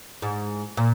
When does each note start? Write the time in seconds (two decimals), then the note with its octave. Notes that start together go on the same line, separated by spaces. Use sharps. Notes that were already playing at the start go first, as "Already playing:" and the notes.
0.22 G#2
0.77 A#2